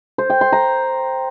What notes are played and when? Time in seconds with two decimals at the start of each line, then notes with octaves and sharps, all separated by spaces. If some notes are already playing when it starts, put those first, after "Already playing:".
0.18 C5
0.30 G5
0.41 C6
0.52 A#5